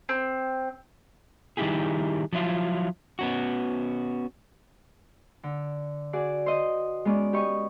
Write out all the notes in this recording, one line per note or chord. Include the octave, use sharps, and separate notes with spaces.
C4
D#3 G3 D#4 E4 G4 G#4
F3 F#3 E4 F4
B3 C#4 F#4
D3
F#4 G#4 D5
C5 D#5
G#3 B3 C#4 D5
G4 B4 D#5 C#6